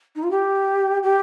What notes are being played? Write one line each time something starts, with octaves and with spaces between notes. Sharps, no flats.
D#4
F4
G4
G4